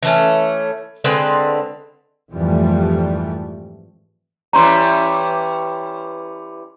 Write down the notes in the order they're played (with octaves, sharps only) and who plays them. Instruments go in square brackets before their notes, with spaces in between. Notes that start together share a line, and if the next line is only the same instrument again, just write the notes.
[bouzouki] E3 A3 C#4
D3 G#3 C4 B4
[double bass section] F2 G#2 E3 F3 G3 A3
[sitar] E3 G3 C#4 [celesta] A#5 C6